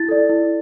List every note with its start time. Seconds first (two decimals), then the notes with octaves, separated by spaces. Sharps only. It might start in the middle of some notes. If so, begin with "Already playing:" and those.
Already playing: E4 A6
0.09 A4 D5
0.29 E4